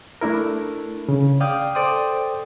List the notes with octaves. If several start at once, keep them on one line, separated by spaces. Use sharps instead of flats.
A3 D4 E4 A#4
C#3
D5 F5 G5 D#6 G6
A4 C5 D5 G5 C6 D#6